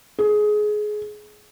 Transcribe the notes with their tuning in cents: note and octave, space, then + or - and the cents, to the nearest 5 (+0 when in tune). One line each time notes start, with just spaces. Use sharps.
G#4 +20